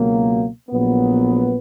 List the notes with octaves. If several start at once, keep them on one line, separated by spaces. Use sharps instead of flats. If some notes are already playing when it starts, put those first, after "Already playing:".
Already playing: C#2 B2 F#3 A#3
A#1 A#2 F#3 B3